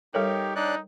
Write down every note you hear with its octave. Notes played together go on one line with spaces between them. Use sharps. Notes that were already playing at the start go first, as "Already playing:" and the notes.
G3 D#4 G4 A4 A#4 C#5 G5
D4 D#4 D5 F#6